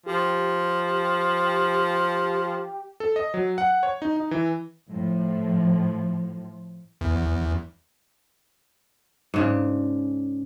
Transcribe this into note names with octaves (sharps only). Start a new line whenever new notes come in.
F3 G4
A4
D#5
F#3
F#5
C#5
D#4
D#4
E3
A2 F3
E2
G#2 C#3 D4